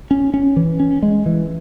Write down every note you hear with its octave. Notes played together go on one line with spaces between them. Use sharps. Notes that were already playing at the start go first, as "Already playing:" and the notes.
C#4
C#4
E3
C#4
G#3
E3